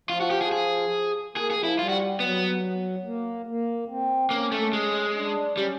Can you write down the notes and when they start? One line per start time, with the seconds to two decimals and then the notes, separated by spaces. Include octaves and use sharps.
0.09 F3 F4
0.20 F#4
0.30 G4
0.41 G#4
0.52 G#4
1.36 A#3 G#4
1.51 G#4
1.57 F3
1.64 E4
1.78 G3 F4
1.89 F#4
2.20 F#3 B3
3.04 A#3
3.47 A#3
3.88 C4
4.30 A#3 C#4
4.52 A3
4.73 G#3
5.15 D4
5.57 G3 C#4